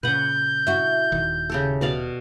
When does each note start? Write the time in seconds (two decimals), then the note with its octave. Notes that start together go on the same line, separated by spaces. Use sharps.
0.03 A#2 C#3 B4 F#5 G6
0.67 E4 F#4
1.12 D#1 D#3
1.50 C#3 G4 A4
1.81 B2 D5 F5